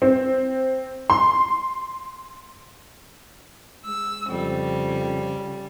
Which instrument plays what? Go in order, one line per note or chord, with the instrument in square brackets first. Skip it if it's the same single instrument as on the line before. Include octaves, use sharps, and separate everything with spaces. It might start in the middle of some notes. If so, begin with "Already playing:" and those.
[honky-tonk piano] C4
C6
[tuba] G#3 [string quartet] E6
[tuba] F2 [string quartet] C#3 G3